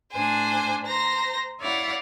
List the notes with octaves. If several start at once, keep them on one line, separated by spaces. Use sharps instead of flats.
A2 D4 C5 G#5
C5 A#5 A#6
E4 C#5 D5 F5 F#5